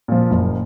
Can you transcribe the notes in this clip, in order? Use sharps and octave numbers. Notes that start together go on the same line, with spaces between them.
A#2 F3
F#1